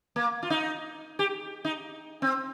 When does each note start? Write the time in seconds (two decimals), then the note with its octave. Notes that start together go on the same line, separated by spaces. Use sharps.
0.16 A#3
0.43 F4
0.50 D#4
1.19 G4
1.65 D#4
2.22 C4